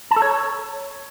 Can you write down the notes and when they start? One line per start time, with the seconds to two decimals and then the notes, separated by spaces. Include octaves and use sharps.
0.11 A5
0.16 A4
0.22 C#5